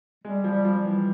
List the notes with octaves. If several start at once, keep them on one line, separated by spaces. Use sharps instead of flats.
G3 G#3
F3
G3
F3
G3
E3